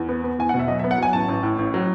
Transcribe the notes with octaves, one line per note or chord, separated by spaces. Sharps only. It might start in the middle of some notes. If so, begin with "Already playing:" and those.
Already playing: E2
B3
B3
E2 G#5
F#5
B2
E5
F#3 D#5
E5
B3
F#5
F#3 G#5
A1 A5
A1
A2
A1
F#3